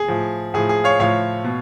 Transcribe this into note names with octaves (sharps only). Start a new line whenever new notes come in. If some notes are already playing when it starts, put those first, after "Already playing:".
Already playing: G#4
A2 F3
A2 F3 G#4
G#4
C#5 F5
A2 F3 C#5 F5
B2